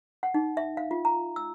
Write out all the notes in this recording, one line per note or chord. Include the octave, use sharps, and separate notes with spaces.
F#5
D#4
E5
F5
F4
A#5
E6